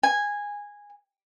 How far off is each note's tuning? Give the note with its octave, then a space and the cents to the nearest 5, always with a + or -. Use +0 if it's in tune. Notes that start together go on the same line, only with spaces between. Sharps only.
G#5 -15